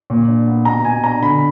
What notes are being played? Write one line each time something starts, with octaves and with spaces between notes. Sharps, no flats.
A#2
D4
B3
B2 A#5
B2 G#5
D4 A#5
D3 B5